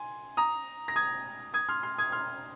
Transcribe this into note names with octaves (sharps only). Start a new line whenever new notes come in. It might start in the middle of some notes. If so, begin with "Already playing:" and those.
Already playing: G#5 C6
A#5 D#6
A#6
D#6 G#6
D#6 G#6
C6 F6
C6 F6
D#6 G#6
C6 F6